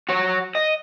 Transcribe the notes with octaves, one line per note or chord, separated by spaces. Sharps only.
F#4 C#5
D#5